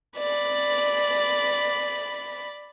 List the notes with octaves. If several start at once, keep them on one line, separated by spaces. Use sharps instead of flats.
D5 B5